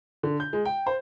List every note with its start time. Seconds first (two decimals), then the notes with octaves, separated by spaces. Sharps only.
0.23 D3
0.40 G6
0.53 G#3
0.65 G5
0.86 C5